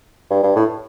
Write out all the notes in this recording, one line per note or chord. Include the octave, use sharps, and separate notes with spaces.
G2
G2
A2